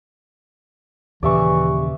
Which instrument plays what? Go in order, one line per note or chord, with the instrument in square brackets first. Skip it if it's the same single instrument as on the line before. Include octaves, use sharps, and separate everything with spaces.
[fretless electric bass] D#2 A#2 C#3 [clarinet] E3 [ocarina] G4 [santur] D5 E5 C#6